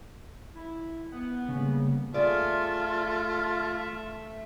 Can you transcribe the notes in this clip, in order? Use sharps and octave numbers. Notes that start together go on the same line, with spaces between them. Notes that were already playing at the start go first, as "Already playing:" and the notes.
E4
B3 F#5
G#2 C#3 G3 A#3
A3 F4 G#4 D5 E5